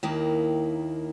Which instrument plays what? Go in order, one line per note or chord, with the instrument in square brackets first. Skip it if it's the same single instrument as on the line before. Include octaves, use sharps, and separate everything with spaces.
[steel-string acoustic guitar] D#2 D#3 A#3 E4